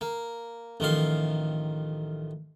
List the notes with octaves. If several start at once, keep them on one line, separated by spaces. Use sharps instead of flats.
A#3
A1 D#3 F3 F5